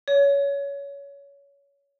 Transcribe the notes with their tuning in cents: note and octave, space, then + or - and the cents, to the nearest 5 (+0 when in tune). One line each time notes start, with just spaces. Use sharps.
C#5 +20